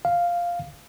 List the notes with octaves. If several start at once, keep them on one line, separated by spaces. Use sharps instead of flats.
F5